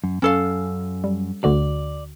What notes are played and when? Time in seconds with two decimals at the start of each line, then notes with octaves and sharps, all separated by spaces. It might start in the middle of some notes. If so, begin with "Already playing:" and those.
0.04 F#2
0.22 F#2 C#4 A4 F5
1.04 G3
1.44 D2 D3 F#4 D5